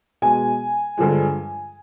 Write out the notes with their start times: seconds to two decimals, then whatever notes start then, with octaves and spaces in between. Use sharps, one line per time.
0.22 B2 G#3 G#5
0.98 G2 D3 F3 G#3